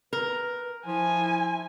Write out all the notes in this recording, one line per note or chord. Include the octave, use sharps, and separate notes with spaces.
A#4 B4
F3 E4 G#5